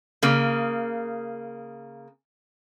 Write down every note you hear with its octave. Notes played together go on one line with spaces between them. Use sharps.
C#3 A#3